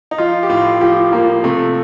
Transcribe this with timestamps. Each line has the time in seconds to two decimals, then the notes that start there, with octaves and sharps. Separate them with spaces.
0.11 D#4
0.18 F3 F4
0.43 G4
0.49 A2 F4
0.81 F3 G4
1.12 F3 A#3
1.44 C3 A3